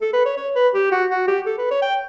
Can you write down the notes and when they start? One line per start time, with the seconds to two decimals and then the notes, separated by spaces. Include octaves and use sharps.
0.01 A4
0.13 B4
0.26 C#5
0.37 C#5
0.55 B4
0.74 G4
0.92 F#4
1.10 F#4
1.28 G4
1.46 A4
1.58 B4
1.71 C#5
1.82 G5